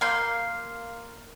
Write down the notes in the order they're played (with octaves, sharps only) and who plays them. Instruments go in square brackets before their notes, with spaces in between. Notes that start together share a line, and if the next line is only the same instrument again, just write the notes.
[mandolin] A#3 C6 G6